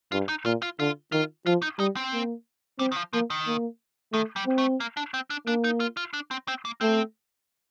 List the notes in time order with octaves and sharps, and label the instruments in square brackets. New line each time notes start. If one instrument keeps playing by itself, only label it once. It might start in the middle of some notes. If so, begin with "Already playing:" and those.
[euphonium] G2 [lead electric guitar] F4
[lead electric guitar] D#4
[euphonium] A#2 [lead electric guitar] F4
[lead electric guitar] F4
[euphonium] D3 [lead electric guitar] F4
[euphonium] D#3 [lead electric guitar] F4
[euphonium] F3 [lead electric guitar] F4
[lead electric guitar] D#4
[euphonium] G3 [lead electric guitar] D#4
[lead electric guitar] C4
[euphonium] A#3
[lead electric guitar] G3 [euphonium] C4
[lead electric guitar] D#3
F3
[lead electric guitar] F3 [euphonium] A#3
[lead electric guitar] D#3
[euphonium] A#3
[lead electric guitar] D#3 [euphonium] A3
[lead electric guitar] G3
[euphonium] C4
[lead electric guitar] A3
A#3
D4
C4
D4
[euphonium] A#3 [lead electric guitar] D4
[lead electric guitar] D#4
F4
F4
D4
C4
C4
A#3
[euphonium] A3 [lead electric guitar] C4